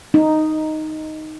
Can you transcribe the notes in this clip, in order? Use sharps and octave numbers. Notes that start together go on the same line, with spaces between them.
D#4